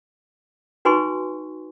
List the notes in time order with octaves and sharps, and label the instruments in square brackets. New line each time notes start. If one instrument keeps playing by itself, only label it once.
[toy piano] D#4 F#4 B4 G#5 C6 C#6